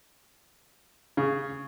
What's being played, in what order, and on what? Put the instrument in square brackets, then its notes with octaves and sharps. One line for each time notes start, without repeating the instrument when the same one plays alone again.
[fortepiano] C#3